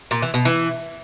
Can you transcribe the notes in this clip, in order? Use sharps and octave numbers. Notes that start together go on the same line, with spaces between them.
A#2
E3
B2
E3